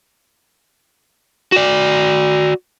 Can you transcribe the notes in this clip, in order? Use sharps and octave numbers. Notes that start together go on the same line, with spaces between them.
F#4 D5